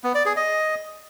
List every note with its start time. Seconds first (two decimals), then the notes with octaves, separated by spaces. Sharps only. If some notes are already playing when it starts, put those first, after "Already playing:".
0.04 B3
0.15 D5
0.26 G#4
0.37 D#5